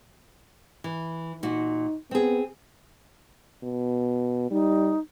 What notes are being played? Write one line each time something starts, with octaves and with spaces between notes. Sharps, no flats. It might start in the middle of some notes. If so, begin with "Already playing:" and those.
E3
A#2 D#4 F#4
B3 C4 G#4
B2
G3 D#4